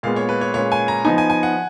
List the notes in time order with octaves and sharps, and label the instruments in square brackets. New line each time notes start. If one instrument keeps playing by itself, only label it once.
[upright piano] A#2 G#3 B3 [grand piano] F5
[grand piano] C#5
B4
C#5
[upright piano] A#2 G#3 C#4 [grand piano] C#5
[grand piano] G#5
A#5
[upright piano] F3 B3 D#4 [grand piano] G#5
[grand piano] G#5
G#5
F#5